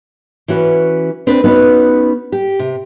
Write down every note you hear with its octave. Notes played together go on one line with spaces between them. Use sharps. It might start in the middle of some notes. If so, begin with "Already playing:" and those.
E3 C#4 F#4 B4
C4 D4 B4
B3 C#4 D#4 F#4 B4
G4
C3